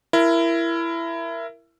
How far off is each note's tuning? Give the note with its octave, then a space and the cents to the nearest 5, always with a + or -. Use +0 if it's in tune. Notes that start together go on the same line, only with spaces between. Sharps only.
E4 +20 A#4 +0